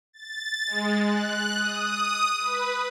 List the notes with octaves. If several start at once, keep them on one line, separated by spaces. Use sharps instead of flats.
A6
G#3
F#6
D#6
B4